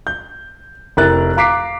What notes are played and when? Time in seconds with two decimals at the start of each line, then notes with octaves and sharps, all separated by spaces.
0.07 G6
0.97 F1 E4 A#4 F#6 A6
1.37 F5 A#5 D6 B6 C7 D7